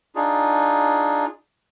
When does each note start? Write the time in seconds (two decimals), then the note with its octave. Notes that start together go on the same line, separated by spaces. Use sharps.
0.15 D4 D#4 F4 G#4